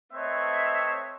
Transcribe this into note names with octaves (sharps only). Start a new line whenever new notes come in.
A3 C4 B4 C#5 D#5 E5